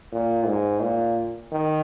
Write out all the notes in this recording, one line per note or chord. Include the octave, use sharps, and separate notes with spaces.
A#2
G#2
A#2
D#3